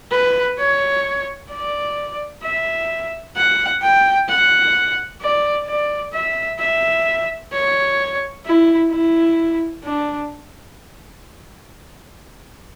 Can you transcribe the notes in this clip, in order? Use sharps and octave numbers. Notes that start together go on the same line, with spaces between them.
B4
C#5
D5
E5
F#5
G5
F#5
D5
D5
E5
E5
C#5
E4
E4
D4